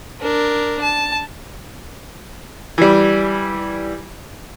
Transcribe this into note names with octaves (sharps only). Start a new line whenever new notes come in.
D4 A#4
A5
E3 G3